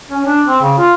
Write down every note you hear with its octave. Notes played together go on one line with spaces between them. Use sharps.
C#4
D4
C4
C#3
F4